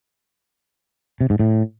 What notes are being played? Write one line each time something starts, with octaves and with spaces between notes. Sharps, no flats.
C3
G#2
A2